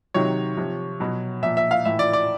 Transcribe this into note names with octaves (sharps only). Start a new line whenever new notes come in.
C3 D#3 F#3 C#5
C3 F3
B2 F#3
A#2 F3 E5
E5
F5
A2 E3 E5
D5
D5